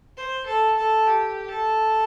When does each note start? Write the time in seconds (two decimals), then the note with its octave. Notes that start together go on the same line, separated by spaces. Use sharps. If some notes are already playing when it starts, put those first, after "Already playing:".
0.17 C5
0.46 A4
0.76 A4
1.07 G4
1.50 A4